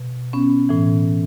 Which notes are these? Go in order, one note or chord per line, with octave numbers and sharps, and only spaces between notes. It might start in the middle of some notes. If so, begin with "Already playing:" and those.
Already playing: B2
B3 C#4
A2 E3